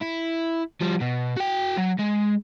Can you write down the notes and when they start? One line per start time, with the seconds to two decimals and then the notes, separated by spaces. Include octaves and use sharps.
0.01 E4
0.81 F3 G3
1.00 B2
1.36 F#4 G5
1.77 F#3
1.99 G#3